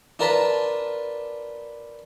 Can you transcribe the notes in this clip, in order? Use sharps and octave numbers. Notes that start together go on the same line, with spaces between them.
D4 F4 A#4 B4 A5 B5